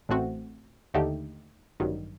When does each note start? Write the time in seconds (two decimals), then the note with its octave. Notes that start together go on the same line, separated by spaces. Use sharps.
0.09 A1 A2 A3 C4 F#4
0.94 D#2 D3 A3 D#4 G4
1.80 A1 G2 D#3 F#3